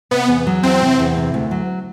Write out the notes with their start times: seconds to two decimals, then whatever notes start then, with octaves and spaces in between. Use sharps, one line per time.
0.11 C3 B3
0.28 E2
0.47 F#3
0.63 E2 C4
0.81 C3
0.99 E2
1.17 C3
1.34 D2
1.51 F#3